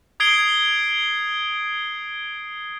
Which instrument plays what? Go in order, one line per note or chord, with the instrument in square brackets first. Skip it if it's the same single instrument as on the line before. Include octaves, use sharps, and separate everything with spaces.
[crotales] D#6 G#6 C7 D7 G7